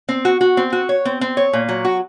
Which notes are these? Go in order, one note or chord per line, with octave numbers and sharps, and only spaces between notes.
C4
F#4
F#4
C4
F#4
C#5
C4
C4
C#5
A#2
F#3
F#4